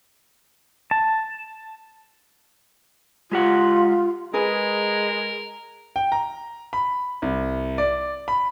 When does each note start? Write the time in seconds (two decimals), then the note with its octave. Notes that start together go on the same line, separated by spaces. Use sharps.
0.91 A5
3.32 G#3 F4 G4 F#5
4.34 G#3 G#4 A#4 B4
5.96 G5
6.12 A#5
6.73 B5
7.22 C2
7.78 D5
8.28 B5